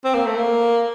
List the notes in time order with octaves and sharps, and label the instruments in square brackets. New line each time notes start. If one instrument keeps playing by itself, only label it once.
[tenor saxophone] C4
A#3
A3
A#3